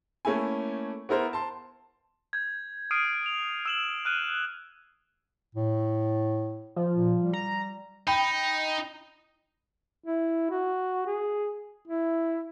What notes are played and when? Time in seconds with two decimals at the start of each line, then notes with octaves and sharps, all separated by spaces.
0.25 A3 A#3 C#4 E4 G#5
1.09 B3 E4 A#4 C5
1.33 A5 C6
2.33 G6 G#6
2.91 D#6 F6 C7 D7 D#7
3.26 F7
3.66 E6 E7 F#7
4.05 F6 F#6 D#7
5.55 A2
6.76 F3
6.95 A#2
7.19 G3
7.33 A#5
8.07 D#4 G5 B5
10.05 E4
10.51 F#4
11.07 G#4
11.88 E4